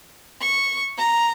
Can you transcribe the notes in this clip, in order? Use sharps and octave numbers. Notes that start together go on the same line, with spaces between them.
C#6
A#5